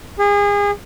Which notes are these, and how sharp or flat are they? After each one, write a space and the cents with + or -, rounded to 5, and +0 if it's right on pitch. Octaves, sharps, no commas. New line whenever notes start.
G#4 -30